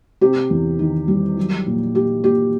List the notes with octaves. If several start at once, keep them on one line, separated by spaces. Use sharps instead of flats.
C3 G4
E2
D#3
G3
F#3
A#2
A#3 G4
A#2 G4